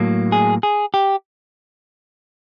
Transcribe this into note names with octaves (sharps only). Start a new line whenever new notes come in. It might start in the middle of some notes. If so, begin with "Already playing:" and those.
Already playing: A2 F#3 A#3
G#4
G#4
G4